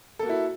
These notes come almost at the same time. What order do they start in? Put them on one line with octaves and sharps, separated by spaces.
A4 A#3 F#4 E4